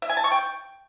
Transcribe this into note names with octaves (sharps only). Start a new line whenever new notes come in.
E5
G#5
A5
C#6
G5